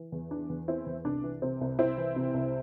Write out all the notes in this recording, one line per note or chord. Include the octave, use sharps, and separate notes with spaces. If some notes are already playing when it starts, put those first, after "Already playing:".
Already playing: E3
E2
E3 D4
E2
E3 C4 E4
E2
C2 D4
E3
C3 C4
C2
C2 C4 E4
E3
C3
C2